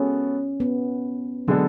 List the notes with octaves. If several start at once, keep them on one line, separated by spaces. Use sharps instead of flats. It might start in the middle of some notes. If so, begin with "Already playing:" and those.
Already playing: G#3 B3 C#4 F#4 A4
B3
D3 F#3 G#3 B3 D4 A4